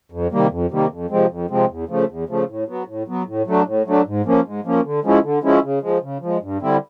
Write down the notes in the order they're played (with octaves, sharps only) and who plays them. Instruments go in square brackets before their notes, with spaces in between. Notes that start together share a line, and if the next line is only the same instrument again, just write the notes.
[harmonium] F2
C3 D#3 G3 A#3
F2
C3 D#3 G3 A#3
F2
C3 F3 G#3 C4
F2
C3 F3 G#3 C4
E2
C#3 F3 A3
E2
C#3 F3 A3
A2
F#3 B3
A2
F#3 B3
A2
F#3 A3 D4
A2
F#3 A3 D4
G#2
F3 A#3 C#4
G#2
F3 A#3 C#4
D3
F3 G#3 C#4 E4
D3
F3 G#3 C#4 E4
C#3
F3 G#3
C#3
F3 G#3
G2
D3 G3 C4 E4